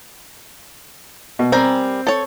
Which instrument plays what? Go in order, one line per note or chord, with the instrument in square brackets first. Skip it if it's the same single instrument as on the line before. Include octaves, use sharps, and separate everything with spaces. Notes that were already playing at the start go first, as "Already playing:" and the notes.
[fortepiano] B2
[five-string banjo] G3 A#4 G#5 [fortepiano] C4
[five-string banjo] A4 C#5